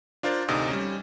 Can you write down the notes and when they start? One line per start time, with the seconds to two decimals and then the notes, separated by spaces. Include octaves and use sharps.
0.23 D4 F4 A#4 C5 D5
0.48 A1 D2 C3 D#4 A4 D#6
0.70 G3 C#4